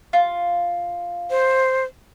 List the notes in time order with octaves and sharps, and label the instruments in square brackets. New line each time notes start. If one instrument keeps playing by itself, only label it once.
[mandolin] F4
[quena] C5